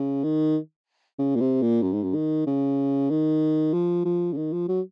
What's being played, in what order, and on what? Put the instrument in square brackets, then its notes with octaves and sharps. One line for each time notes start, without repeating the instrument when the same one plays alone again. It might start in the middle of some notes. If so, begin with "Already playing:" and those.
Already playing: [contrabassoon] C#3
D#3
C#3
A#2
C3
A#2
F#2
G#2
F#2
D#3
C#3
D#3
F3
F3
C#3
D#3
F3
F#3